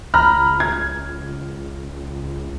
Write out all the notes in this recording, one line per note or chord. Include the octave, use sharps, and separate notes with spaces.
C#2 A#5 B5 F6
G#6